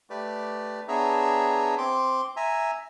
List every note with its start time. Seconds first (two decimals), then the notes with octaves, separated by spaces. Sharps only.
0.10 A3 G4 B4 D5
0.88 B3 D4 G#4 C#5 E5 A#5
1.78 C4 C6 D6
2.36 E5 G#5 A#5